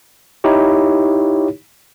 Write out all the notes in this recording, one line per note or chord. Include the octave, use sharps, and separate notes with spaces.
D#4 E4 G4 C#5